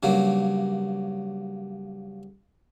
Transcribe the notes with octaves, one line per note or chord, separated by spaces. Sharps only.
G2 C#3 F#3 A#3